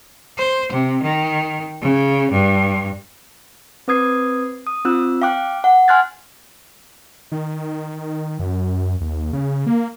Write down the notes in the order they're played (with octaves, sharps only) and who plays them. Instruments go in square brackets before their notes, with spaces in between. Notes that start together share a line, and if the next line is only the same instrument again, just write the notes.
[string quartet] C5
C3
D#3
C#3
G2
[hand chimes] C4 B4 D#6 G#6 C7
D#6
C4 F4 E6 F#6
F5 G5 D6 F#6
F#5
G#5 C6 F6 F#6 G#6 A6
[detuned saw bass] D#3
F#2
D#2
C#3
A#3